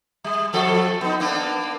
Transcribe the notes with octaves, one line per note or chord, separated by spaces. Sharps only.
G3
F2 F3 A4
B3 D#4
A#3 B3 D4